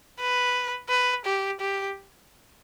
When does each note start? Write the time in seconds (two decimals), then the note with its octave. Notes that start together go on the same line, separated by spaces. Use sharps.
0.20 B4
0.89 B4
1.26 G4
1.60 G4